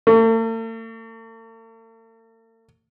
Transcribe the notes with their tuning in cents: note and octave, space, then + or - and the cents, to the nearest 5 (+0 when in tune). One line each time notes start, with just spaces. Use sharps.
A3 +45